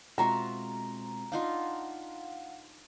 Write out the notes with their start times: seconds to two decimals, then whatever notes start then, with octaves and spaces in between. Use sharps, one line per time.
0.18 B2 G#3 C4 F4 F#4 E5 A#5
1.32 D4 D#4 F4 F5 F#5